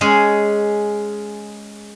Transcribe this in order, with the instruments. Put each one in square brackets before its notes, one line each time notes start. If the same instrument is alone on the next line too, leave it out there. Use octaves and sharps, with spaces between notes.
[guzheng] G#3 C#4 G#4